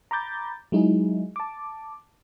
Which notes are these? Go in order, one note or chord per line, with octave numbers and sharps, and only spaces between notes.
A#5 B5 D6 G6 A6
F#3 G#3 D#4 E4 G#4
A5 D6